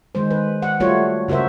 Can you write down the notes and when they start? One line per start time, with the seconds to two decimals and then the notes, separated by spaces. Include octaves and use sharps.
0.15 D#3 G#3 C5
0.31 B4
0.62 F#5
0.80 G3 A3 F4 F#4 C#5
1.28 C#3 F#4 A#4 C5 E5